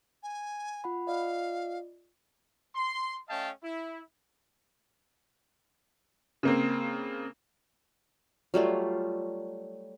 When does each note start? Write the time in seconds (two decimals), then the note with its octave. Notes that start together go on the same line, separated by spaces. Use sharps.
0.23 G#5
0.84 F4 F#5 B5
1.07 F4 D5 D#5 F5
2.75 C6
3.29 A3 C#4 D#5 F5 G5 A5
3.63 E4
6.43 C#3 A#3 C4
8.54 F#3 G3 A3 F4